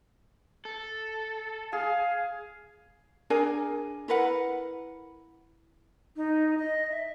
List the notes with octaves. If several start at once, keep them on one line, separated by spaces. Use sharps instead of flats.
A4
G#4 F5
D4 G#4 A#4 G#5
E4 A#4 B4 F#5
D#4
D#5
E5